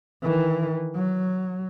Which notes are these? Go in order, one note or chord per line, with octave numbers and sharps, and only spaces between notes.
D#3 E3
F#3